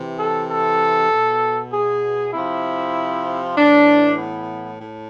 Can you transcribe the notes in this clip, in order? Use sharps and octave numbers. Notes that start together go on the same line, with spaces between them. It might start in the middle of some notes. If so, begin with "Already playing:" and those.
Already playing: C3 E3
A4
A4
B2
G#4
C3 F3 E4
A2 E3 D4
B3
A2